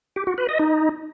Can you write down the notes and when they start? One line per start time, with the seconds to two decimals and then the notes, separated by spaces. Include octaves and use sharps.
0.16 G4
0.27 F#4
0.38 B4
0.49 D#5
0.59 D#4